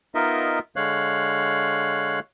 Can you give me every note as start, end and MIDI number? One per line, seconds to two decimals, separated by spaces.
0.15 0.59 59
0.15 0.59 63
0.15 0.59 65
0.15 0.59 70
0.15 0.59 75
0.15 0.59 76
0.76 2.19 50
0.76 2.19 56
0.76 2.19 73
0.76 2.19 77
0.76 2.19 90